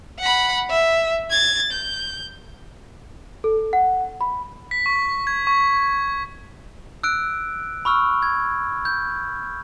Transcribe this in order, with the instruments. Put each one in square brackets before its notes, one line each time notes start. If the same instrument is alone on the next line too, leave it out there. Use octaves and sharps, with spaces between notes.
[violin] F#5 B5
E5
G#6 A6
G6
[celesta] A4
F#5
B5
[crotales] B6
C#6
G#6
C#6
[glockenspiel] E6 F#6 D7
B5 C#6 E6 F6
G#6
G6